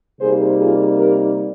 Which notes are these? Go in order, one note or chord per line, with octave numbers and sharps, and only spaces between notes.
C3 G3 A#3 D#4 G#4 C5
F4 G#4
G4 A#4